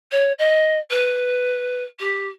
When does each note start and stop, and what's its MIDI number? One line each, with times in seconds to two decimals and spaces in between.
0.11 0.32 73
0.38 0.79 75
0.90 1.83 71
1.99 2.28 67